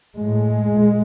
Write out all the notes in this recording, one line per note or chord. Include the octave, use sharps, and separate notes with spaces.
A2 G#3
A#2